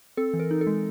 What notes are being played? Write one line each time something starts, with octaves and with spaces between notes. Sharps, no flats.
C4 A4
E3
A#4
D#4
A4
G#3